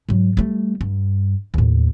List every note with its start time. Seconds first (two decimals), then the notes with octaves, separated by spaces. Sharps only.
0.09 G#2 F#3
0.37 G3 A3
0.81 G2
1.54 D#2 A2